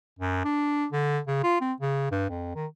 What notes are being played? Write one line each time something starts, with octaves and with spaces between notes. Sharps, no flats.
F#2
D4
D3
C#3
F4
C4
C#3
G2
F2
D#3